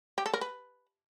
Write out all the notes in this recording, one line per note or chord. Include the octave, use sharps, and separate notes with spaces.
G4
A4
A#4
B4